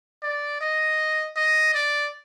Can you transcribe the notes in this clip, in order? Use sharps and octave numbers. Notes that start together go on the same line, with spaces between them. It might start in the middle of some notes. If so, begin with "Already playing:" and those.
D5
D#5
D#5
D5